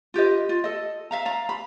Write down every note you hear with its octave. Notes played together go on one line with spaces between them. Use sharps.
F4 G4 B4 D#5
F4
A4 D#5
E5 F5 A#5
D5 F5 A#5
B5